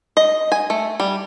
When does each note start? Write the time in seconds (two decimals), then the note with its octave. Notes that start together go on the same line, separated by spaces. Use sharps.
0.17 D#5
0.52 G#5
0.70 A3
1.00 G3